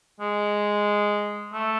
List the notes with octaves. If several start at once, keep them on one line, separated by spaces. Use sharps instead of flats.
G#3
A3